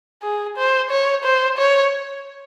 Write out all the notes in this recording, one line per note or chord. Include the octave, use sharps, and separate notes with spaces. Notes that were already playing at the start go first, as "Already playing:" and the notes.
G#4
C5
C#5
C5
C#5